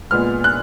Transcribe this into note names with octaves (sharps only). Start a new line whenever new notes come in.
A#2 G#3 B3 F6
F#6